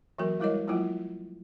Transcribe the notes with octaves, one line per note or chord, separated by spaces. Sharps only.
E3 F#3 A#3 F#4 A#4
G3 G#3 E4 A#4 C#5 D#5
F3 F#3 A3 A#3 E4 F4